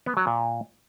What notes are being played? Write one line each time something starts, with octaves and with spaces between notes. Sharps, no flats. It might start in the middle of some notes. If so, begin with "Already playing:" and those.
B3
F#3
A#2